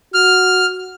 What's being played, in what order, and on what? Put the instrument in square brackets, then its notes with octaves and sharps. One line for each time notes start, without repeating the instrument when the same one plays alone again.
[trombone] F#4 [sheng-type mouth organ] F6